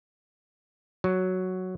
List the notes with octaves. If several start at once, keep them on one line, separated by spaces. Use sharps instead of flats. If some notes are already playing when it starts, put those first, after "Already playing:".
F#3